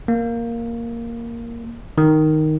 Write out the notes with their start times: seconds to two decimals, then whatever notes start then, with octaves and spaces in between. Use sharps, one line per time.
0.08 A#3
1.98 D#3